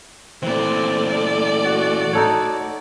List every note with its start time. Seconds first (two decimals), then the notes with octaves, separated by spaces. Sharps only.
0.43 A#2 E3 A3 C4 D5
1.65 F#4
2.13 D#4 A4 C#5